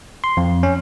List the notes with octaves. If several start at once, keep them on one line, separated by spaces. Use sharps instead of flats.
C6
F2
C#4